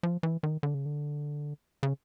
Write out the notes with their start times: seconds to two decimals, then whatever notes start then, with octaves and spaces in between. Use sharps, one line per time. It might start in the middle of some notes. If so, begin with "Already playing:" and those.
0.03 F3
0.23 E3
0.43 D#3
0.63 D3
0.74 C#3
0.86 D3
1.83 C#3